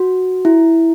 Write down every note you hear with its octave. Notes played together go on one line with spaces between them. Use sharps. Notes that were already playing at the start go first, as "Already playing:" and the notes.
Already playing: F#4
E4